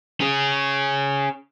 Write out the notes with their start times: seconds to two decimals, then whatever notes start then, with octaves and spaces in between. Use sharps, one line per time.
0.20 C#4 G#4